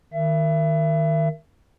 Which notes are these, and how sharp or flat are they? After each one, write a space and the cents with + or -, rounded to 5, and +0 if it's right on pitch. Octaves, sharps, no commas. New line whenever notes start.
D#3 +0 E5 +30